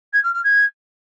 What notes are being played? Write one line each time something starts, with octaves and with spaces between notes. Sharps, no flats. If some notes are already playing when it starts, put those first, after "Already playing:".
G#6
F6
F6
G#6